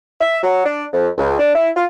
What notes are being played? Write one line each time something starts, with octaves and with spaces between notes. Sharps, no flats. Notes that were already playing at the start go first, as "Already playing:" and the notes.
E5
F#3
D4
F2
C#2
D4
E4
F4